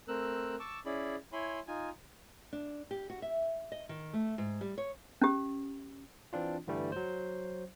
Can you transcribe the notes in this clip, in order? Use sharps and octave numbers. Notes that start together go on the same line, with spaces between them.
A3 C4 A#4 E6 F#6
A5 C#6 D6 E6
C#4 E4 G#4 D5 B5
E4 C#5 G#5 B5 C6
D#4 F4 G#5
D4
G4
F#4
E5
D#5
D#3
A3
G#2
G3
C#5
C#4 G4
E3 C4 D4 F4
G2 D3 E3 G3 A3
F#3 C5